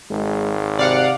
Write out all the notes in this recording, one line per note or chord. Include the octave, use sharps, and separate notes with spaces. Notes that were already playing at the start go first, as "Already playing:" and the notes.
G#1 G#3
C3 D5 F5 F#5